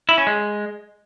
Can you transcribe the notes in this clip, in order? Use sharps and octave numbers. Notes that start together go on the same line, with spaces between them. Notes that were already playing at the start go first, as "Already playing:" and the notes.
E4
C#4
G#3